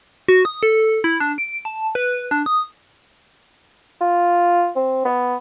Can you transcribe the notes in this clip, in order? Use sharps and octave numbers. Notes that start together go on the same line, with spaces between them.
F#4
D#6
A4
E4
D4
D7
A5
B4
D4
D#6
F4
C4
B3